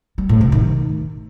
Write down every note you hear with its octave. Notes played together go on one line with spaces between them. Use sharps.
G3
A2
C3
D#3